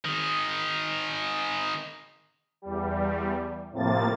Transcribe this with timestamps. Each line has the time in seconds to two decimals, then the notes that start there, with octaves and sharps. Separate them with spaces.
0.05 D#3 G#4
2.62 E2 G3
3.71 A2 C3 F3 A#3 A6